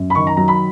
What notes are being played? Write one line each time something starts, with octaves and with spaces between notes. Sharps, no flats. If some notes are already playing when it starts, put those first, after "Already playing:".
Already playing: F#2
B5
D#3 C#6
A#5
F#3 A#5
B5